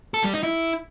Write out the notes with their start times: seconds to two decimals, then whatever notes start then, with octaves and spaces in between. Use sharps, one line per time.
0.14 A4
0.24 G3
0.33 D#4
0.43 E4